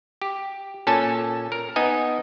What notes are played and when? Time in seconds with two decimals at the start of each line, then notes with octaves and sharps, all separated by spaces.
0.22 G4
0.87 A#2 C#4 A4 G#5 A5
1.52 A#4
1.76 B3 D#4 D#5 G#5